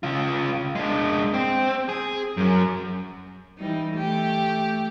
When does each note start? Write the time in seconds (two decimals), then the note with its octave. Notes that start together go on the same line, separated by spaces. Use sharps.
0.03 C#3 F4
0.75 G#3 D4
1.34 C4
1.89 G#4
2.37 F#2 F#3
3.58 E3 G3 D#4
3.93 A3 G4